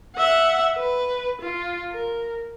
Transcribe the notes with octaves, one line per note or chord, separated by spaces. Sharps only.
E5 F#5
B4
F4
A#4